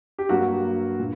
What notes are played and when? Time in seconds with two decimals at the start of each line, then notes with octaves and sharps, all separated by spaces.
0.18 G4
0.29 G2 F#3 A#3 F#4
0.99 A#2